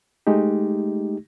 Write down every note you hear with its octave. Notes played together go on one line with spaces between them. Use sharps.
G#3 A3 D#4 G4